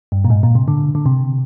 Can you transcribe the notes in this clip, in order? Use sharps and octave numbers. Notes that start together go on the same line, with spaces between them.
G2
A#2
G#2
A#2
C3
D3
D3
C3